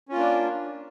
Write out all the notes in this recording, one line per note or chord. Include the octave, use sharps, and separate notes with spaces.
A#3 C#4 D4 F4